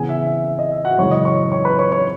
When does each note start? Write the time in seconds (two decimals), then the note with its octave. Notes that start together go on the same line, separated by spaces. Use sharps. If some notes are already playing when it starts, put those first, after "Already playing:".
Already playing: C#3 E3 B3 G#4 G#5
0.09 E5
0.27 E5
0.44 E5
0.59 D#5
0.72 E5
0.85 F#4 F#5
0.98 F#2 C#3 E3 G#3 C#5 C#6
1.11 D#5 D#6
1.25 C#5 C#6
1.52 C#5 C#6
1.65 B4 B5
1.78 C#5 C#6
1.92 C#5 C#6